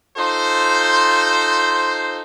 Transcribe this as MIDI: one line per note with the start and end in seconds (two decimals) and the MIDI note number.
0.17 2.22 63
0.17 2.22 65
0.17 2.22 69
0.17 2.22 72